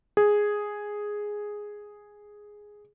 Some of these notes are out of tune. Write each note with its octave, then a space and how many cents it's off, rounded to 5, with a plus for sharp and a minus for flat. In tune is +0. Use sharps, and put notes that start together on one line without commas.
G#4 +0